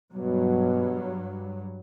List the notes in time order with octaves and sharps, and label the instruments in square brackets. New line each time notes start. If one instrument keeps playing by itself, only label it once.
[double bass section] G2 F#3 [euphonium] B2